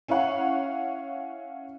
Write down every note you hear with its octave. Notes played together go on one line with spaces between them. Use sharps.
C#4 E4 C#5 F5 F#5 C#6